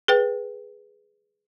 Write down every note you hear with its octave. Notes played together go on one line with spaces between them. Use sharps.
G#4 B4 G5